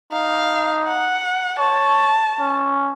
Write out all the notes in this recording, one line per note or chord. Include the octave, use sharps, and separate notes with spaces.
D#4 F5
F#5
C#5 A5
C#4